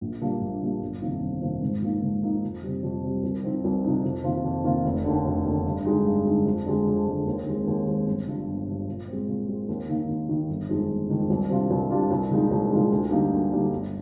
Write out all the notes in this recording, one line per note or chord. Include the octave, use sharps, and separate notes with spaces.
A#1
A#2 G3 A#3 D4
A#1
A#2 G3 A#3 D4
G1
F2 C3 D#3 A#3
G1
F2 C3 D#3 A#3
G#2
F3 A#3 D#4
G#2
F3 A#3 D#4
F2
C3 G3
F2
C3 G3
C2
C3 F3 C4 D#4
C2
C3 F3 C4 D#4
F2
C3 D#3 A#3 F4
F2
C3 D#3 A#3 F4
F1
D#2 D3
F1
D#2 D3
G2
D3 G#3 D#4
G2
D3 G#3 D#4
F2
D3 G#3
F2
D3 G#3
D#2
D#3 G#3 C4
D#2
D#3 G#3 C4
G1
G2 F3
G1
G2 F3
A#2
G#3 C4
A#2
G#3 C4
D#2
D#3 A#3 D#4
D#2
D#3 A#3 D#4
G1
F2 D#3 G#3 D#4
G1
F2 D#3 G#3 D#4
C2
C3 G3 D4 F4
C2
C3 G3 D4 F4
C2
A#2 F3 G#3 D#4
C2
A#2 F3 G#3 D#4
D2
D3 G3 A#3 D#4
D2
D3 G3 A#3 D#4
G1